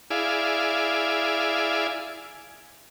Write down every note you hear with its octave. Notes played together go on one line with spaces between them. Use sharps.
E4 G#4 D5 F5